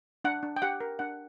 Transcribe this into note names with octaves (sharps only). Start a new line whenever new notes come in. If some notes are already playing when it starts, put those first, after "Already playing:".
D4 F#5
D4
G5
G4 F#5
A#4
D4 F#5